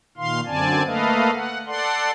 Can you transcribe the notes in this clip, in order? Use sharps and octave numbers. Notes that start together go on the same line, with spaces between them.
A#2 D#3 F5 C6
F#2 D3 C4 D5 G#5 A5
A3 A#3 A4 B4 D#5 F5
F#5
A4 D5 F#5 C6